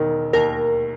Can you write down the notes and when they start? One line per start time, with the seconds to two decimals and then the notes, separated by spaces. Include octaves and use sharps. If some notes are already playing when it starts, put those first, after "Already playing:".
Already playing: E1 D#3 A#4
0.33 D#2 A#4